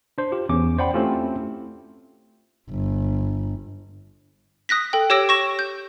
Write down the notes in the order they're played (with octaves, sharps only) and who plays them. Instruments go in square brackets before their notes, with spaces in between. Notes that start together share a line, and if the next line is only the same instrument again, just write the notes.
[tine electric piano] D4 C5
F4 G4
E2 C#4 D6
C5 D5 F#5 G5 B5
A3 C4 C#4 E4 F4 G4
[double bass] G1
[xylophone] D#6 F#6 A#6 B6
A4 G5
G4 C#5 D6 E6 A#6 D7
C#6 A#6 E7
G6